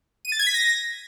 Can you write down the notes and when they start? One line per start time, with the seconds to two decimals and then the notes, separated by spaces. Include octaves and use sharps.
0.25 D#7
0.32 A6
0.39 G#6
0.47 B6
0.54 A#6